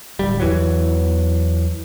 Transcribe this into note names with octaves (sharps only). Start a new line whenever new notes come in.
D1 G3
E2 E3 F#3